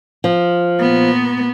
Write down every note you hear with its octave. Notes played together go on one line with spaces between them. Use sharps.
F3
A#2 B3